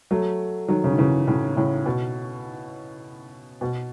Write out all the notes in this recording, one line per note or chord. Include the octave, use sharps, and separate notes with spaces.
F#3 A3
D#3 F#3
C#3
D#3
C#3 E3
A2 C#3
A2 C#3
B2
B2